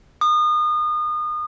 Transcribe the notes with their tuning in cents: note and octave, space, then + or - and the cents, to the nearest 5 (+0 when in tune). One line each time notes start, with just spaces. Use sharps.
D#6 -30